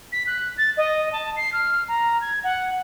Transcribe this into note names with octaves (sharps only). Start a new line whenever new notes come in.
B6
F#6
A6
D#5
A5
C7
F6
A#5
G#6
F#5